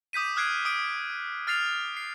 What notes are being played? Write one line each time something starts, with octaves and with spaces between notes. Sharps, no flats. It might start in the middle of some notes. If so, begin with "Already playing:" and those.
D6 D#6 G6 B6 D#7
D#6 F6 F#6 G#6 C7 D7
D#6 D7
F6 A6 C7 F7
C7